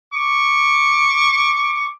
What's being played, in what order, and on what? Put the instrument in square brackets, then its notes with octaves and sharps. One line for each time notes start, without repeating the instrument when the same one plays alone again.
[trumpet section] C#6 D6